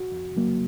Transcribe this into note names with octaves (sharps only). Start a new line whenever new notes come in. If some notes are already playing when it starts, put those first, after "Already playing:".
Already playing: F#4
F2
C#3 F#3 A#3